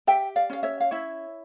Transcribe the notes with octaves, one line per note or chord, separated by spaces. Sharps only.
G4 E5 G5
D5 F5
C#4 F5
C#5 E5
F5
E4 C#5 E5